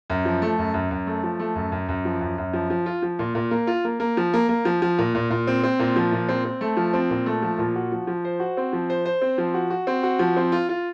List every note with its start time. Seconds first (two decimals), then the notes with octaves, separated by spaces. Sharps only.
0.10 F#2
0.25 F3
0.42 A3
0.59 F#2
0.74 F#2
0.91 F#2
1.07 A3
1.23 F3
1.40 A3
1.55 F#2
1.72 F#2
1.89 F#2
2.05 F3
2.21 F#2
2.38 F#2
2.53 F3
2.70 F3
2.86 F4
3.02 F3
3.19 A#2
3.35 A#2
3.51 A#3
3.67 F4
3.85 A#3
4.00 A#3
4.17 F3
4.33 A#3
4.49 A#3
4.65 F3
4.82 F3
4.98 A#2
5.15 A#2
5.30 A#2
5.47 C4
5.63 C4
5.79 A#2
5.96 F3
6.12 A#2
6.29 C4
6.45 C4
6.61 A3
6.77 F3
6.93 C4
7.10 A#2
7.26 A3
7.42 F3
7.58 A#2
7.76 F#4
7.92 F3
8.07 F3
8.25 C5
8.40 F#4
8.57 C4
8.73 F3
8.90 C5
9.05 C5
9.21 C4
9.38 F3
9.54 F#4
9.70 F#4
9.87 C4
10.03 F#4
10.19 F3
10.36 C4
10.52 F4
10.69 F4